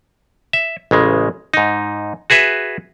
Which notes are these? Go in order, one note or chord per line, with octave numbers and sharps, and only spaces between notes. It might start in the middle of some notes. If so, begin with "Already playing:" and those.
E5
A1 C#3 G#3
G#2 D#4
F#4 G#4 B4 E5